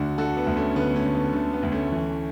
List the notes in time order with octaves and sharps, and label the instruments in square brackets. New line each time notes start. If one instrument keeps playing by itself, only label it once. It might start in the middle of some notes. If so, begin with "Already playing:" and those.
Already playing: [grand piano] D2 D3 D4 F#4
D3 F#4 A4
B3
D2
A3 C#4
C#4
D3 B3
A3 C#4
D3
B3
D3 A3
B3
D2
A3 C#4
E3